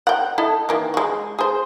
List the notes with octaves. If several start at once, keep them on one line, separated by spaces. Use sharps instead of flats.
F#5 G5
E4 A4 D#5
D#3 E3 A#3
G#3 F#4
G#4 C5